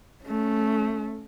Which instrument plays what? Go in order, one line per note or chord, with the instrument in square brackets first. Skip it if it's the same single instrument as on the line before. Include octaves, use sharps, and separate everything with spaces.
[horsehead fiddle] A3 C#4